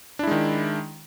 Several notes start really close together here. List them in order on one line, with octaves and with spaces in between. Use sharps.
D4 E4 G#3 D#3